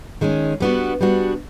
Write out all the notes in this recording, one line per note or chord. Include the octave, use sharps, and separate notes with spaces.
D#3 G#3 C#4
G3 B3 D4 F#4
G3 B3 D4 F#4